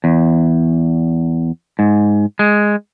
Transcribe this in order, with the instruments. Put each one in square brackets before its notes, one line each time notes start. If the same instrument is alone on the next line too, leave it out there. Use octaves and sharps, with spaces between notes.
[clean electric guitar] E2
G#2
G#3